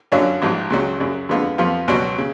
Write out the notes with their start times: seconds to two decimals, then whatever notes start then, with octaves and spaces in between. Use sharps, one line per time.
0.12 F#2 D3 F#3 C#4 F4
0.42 A1 G#2 F3
0.70 C#2 C#3 F#3
1.00 F#2 C#3 F#3
1.29 F2 D3 G#3 B3 F4
1.58 F2 F3 B3 F4
1.88 C#2 B2 F#3
2.18 C#3